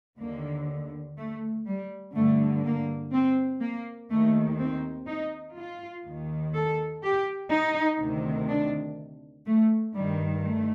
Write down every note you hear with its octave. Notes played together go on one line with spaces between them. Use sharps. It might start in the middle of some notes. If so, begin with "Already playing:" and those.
D#2 D3 A#3
A3
G3
G2 D3 A3
A#3
C4
A#3
D#2 D#3 A3
C4
D#4
F4
D#2 D#3
A4
G4
D#4
D2 C3 D#3
D4
A3
G2 D#3 G3
A3